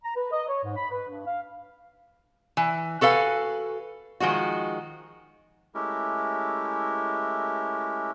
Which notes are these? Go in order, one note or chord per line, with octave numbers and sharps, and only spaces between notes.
A#5
B4
D#5
C#5
G#2
B5
B4
G2
F5
E3
F#4 A4 B4 F5 G#5
D#3 F3 G#3 F#4
G#3 A3 C#4 E4 G4 A#4